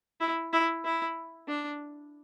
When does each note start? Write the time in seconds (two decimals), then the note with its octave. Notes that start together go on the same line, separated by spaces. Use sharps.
0.21 E4
0.53 E4
0.85 E4
1.48 D4